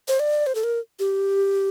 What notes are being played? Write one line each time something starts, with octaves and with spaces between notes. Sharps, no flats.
C5
D5
C5
A4
A#4
G4